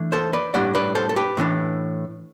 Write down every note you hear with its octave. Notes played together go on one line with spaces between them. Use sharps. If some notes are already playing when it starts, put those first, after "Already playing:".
Already playing: E3 A3 D4
A4 C5
B4 D5
A2 G3 D4 D5 F#5
B4 D5
A4 C5
A4
G4 B4
A2 E3 B3 D4